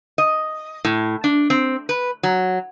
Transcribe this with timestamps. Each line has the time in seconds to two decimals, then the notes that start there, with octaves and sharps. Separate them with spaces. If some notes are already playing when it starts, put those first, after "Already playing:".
0.18 D#5
0.85 A2
1.24 D4
1.50 C4
1.89 B4
2.23 F#3